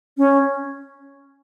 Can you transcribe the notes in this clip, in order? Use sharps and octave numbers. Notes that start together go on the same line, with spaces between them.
C#4